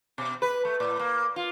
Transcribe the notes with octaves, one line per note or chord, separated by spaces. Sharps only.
B2
B4
A3
A2
A#3
F4